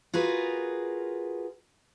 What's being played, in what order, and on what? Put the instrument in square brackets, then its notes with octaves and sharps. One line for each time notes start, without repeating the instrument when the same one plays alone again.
[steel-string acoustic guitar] F4 F#4 G#4 A#4 B4